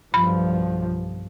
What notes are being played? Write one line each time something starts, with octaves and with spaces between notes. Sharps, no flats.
B1 G2 F3 B5